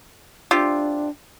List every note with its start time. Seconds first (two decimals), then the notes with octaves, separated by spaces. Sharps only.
0.51 C3 D4 F4 G4